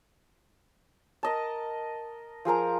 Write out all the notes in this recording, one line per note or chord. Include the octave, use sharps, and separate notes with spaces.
A#4 D#5 A5
F3 G#4 A#4 A#5